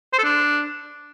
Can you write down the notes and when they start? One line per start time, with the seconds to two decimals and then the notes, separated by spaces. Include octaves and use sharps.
0.13 C5
0.19 A4
0.24 D4